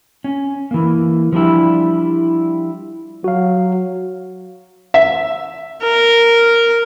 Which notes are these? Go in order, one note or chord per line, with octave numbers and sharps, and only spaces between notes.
C#4
E3 A#3
F3 G3 D4 E4
F#3 F#4 F5
E5
A#4